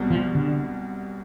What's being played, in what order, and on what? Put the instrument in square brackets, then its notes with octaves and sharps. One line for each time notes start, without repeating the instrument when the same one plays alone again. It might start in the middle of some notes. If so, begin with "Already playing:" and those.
Already playing: [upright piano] C2 B2 F#3
[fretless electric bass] F3
D3